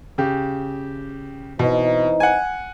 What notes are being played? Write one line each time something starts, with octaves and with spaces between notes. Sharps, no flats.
C#3 G4
B2 E3 C4 D#4
F#5 G#5